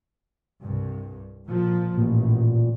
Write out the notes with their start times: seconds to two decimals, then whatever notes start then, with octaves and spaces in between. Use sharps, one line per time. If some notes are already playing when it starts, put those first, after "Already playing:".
0.62 C2 G2
1.48 A#2 F3
1.97 A1 A#2